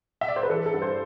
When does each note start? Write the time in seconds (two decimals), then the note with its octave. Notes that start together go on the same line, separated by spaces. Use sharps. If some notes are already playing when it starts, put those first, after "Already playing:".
0.21 E5
0.28 D5
0.36 C5
0.43 B4
0.50 E3 A4
0.66 A4
0.74 G2
0.82 C5